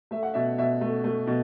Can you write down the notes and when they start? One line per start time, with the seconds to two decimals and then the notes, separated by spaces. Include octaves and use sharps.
0.11 A3 E5
0.23 F#5
0.34 B2 E5
0.58 B2 E5
0.81 A3
1.04 A3
1.27 B2